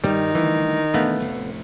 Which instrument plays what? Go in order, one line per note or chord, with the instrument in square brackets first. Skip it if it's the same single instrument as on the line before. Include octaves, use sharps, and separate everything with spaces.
[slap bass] G2 [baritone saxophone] D#3 [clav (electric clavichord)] G3
[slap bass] D3 G3 A3 [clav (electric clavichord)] E3
[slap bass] E1 A1 D4 [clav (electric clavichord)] A3 B3 F5
[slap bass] F1 D2 A2